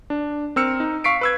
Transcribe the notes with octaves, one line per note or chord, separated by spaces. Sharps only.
D4
C4 A#4 E6 F6 C#7
D#4
F5 C#6 B6 C7 D7
B4 E6 G#6